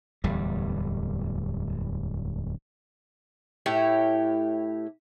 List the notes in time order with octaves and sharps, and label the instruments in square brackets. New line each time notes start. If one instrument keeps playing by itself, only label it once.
[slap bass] D1 E2 G3
[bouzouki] A2 E4 G4 C#5